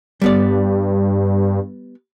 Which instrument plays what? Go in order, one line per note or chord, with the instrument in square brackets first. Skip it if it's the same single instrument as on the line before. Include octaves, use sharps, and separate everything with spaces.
[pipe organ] G2 [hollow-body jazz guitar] G3 B3 D5